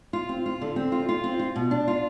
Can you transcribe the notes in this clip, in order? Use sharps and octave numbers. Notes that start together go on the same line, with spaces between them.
F4
C4
F4
D3
C4
F4
F4
C4
F4
B2
D4
F4